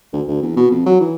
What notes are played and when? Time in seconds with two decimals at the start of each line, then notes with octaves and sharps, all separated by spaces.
0.13 D2
0.28 D2
0.42 E2
0.57 B2
0.72 F2
0.86 F#3
1.00 E3